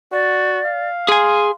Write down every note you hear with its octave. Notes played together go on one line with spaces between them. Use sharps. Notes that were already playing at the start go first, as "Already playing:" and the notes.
F#4 D5
F5
G#4 G#5 C6